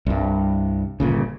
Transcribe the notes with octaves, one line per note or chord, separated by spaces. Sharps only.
C2 G2
G1 A#2 C#3